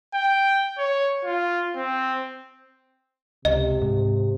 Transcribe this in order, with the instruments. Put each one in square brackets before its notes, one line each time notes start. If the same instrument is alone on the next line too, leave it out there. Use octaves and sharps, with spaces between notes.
[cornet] G5
C#5
F4
C4
[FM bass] C#2 [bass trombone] C3 [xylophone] D#5
[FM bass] G#2